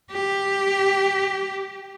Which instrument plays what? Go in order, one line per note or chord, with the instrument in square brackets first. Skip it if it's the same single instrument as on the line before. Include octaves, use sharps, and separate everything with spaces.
[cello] G4